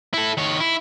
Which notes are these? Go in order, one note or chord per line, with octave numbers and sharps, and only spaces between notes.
E4 A4
D#3 C#5
E4